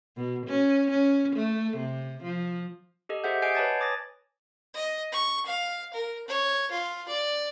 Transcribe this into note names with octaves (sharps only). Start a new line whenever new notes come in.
B2
C#4
C#4
A3
C3
F3
G4 A4 D#5
G4 G#4 C5 E5 F#5 G6
D#5 F#5 G#5 G6 C7 D7
B4 C#5 G#5 A5 G#6 A6
B4 D6 D#6 A6 A#6
D#5
C#6
F5
A#4
C#5
F4
D5